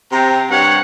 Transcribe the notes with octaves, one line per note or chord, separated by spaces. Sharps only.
C3 A#5
G2 C3 C#5 F#5